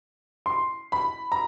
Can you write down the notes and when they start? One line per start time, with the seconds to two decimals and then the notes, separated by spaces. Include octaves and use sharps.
0.46 C6
0.92 B5
1.32 A#5